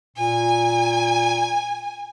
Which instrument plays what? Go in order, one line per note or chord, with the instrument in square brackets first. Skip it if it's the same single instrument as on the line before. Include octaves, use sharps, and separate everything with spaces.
[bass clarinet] A#2 [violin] G#5